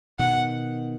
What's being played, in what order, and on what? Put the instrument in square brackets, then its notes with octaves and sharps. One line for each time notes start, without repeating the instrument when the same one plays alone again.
[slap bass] B2 D#3 [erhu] F#5